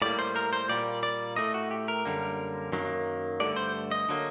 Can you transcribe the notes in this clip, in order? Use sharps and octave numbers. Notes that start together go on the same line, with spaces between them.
A2 G3 A#3 D5
C5
A#4
C5
A#2 G3 A#3 D5
D5
A2 A3 D#5
F#4
G4
A#4
F#2 D3 G3 A#3
F#2 D#3 F#3 A#3
G2 D3 A3 D5
C5
D#5
D3 F#3 A#3